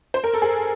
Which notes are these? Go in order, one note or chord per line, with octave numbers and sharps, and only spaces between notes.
C5
A#4
A4
G#4